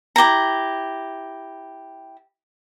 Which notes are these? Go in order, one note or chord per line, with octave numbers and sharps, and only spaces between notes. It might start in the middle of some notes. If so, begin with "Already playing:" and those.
E4 G4 G#4 A#5